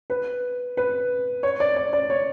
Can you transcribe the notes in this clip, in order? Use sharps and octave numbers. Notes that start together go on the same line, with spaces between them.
B4
B4
C#5
D5
D5
D5
C#5